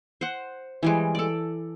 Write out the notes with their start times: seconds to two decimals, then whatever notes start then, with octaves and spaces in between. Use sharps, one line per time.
0.21 C5 F#5
0.83 E3 G3 G#3
1.15 A4 D5